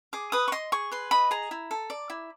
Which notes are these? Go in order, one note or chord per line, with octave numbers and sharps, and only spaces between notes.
G#4 D6
B4 D#6
C#6
D#5 C6
G#4 C#6
B4 C6
D#5 B5
G#4 A#5
E4
A4
D5
E4